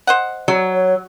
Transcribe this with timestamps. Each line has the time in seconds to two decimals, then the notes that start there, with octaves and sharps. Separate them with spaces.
0.07 C5 D#5 F#5
0.48 F#3
0.73 C#5